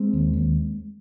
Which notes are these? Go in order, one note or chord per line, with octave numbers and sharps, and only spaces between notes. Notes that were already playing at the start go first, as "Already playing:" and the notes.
Already playing: G#3 C4
D#2
D#2